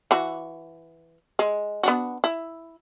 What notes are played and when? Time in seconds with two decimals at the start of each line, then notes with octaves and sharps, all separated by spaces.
0.11 E3 F#4
1.39 G#3
1.83 B3 D4 F#4
2.24 E4